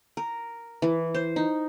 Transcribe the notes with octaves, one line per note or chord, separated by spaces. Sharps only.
A#4
E3
C5
D#4